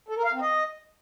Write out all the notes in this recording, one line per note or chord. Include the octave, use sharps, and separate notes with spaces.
A4
A#4
F5
C4
D#5